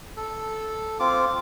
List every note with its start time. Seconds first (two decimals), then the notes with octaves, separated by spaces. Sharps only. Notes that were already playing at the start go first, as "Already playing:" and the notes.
0.17 A4
1.00 C4 F4 D6